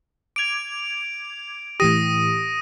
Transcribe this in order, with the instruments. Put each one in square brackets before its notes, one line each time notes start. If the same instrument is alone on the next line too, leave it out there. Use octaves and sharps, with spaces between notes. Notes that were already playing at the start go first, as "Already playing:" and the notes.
[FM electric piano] D6 G#6 [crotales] D7 F7
[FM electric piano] A2 E3 G4 [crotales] D#6 A#6 D#7